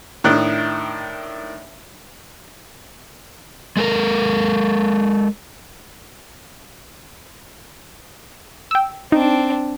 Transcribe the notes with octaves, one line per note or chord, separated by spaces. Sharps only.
A2 D#3 D4 F#6
G#3 A4 A#4
G5 E6
C4 D4 D#4